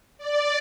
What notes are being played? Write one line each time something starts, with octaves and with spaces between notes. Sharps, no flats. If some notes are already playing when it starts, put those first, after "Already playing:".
D5